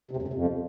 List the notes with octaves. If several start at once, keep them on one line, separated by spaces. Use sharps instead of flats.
C3
E2
F#2
C3
F2